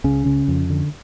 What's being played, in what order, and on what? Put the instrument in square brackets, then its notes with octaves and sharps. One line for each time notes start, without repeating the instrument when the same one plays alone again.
[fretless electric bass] C#2 C#3 C#4
C#3
F2
D3